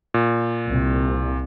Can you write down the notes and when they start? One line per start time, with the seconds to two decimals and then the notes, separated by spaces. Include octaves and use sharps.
0.14 A#2
0.66 C2